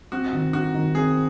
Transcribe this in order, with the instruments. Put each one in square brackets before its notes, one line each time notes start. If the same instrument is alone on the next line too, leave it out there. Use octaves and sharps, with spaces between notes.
[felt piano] C4 [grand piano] F#4
[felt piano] D#3
[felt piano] D#4 [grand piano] F#4
[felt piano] D#3
[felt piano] C4 [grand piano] G#4